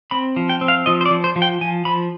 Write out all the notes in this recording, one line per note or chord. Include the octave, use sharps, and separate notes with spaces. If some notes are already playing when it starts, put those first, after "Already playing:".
C4 B5
F3
G5
C4
F5
F3 D#5
C5
D5
F3
C5
F3
G5
F3 G#5
F3 B5